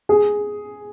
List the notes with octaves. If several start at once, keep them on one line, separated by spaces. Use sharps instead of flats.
G#4